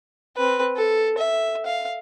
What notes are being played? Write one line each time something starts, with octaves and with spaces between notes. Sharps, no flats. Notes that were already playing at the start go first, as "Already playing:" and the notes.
C4 B4
A4
E5
F5